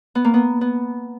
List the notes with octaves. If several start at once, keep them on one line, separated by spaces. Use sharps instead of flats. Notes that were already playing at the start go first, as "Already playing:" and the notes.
B3
A#3
B3
B3